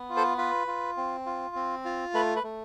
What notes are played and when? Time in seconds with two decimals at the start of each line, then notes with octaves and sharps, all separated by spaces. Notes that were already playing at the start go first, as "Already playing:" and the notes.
Already playing: B3
0.09 F4
0.16 A4 C5
0.38 F4 B4
0.67 F4
0.97 C4
1.26 F4
1.56 C4
1.85 F4
2.14 A3 B4
2.36 B4
2.43 A3